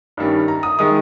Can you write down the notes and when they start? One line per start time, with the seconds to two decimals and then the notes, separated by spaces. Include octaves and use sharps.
0.17 G2 D#3 G3 C#4
0.48 A#5
0.63 D#6
0.79 D#3 G#3 D#6